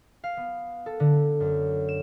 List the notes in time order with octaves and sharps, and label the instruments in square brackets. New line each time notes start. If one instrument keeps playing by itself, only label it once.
[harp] F5
B3
A4
D3
F#2
E7